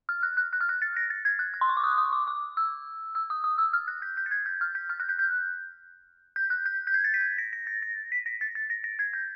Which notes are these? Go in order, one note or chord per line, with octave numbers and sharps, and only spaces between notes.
F6
F#6
F#6
F#6
F6
F#6
A6
A#6
A6
G#6
F#6
F#6
C6
C#6
D6
D#6
D#6
D6
D6
E6
E6
D#6
D#6
E6
F6
F#6
G6
G6
A6
G#6
G6
F6
G6
F6
F#6
G6
G6
G6
F#6
G6
G6
G#6
A6
B6
A#6
A#6
A6
A#6
B6
A#6
A6
A6
A#6
A#6
G#6
G6